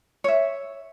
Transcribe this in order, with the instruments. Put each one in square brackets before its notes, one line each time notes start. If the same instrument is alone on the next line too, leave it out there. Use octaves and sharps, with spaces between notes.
[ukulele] C#5 E5